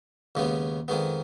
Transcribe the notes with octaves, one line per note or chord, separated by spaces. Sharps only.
D#2 C#3 G#3 B3
F2 D#3 G#3 B3